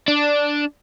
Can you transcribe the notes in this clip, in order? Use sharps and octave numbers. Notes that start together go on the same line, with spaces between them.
D4